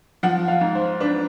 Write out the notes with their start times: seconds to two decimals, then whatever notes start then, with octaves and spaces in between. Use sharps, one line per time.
0.23 F3 F#5
0.48 F5
0.61 G#2
0.75 C5
1.00 D4 B4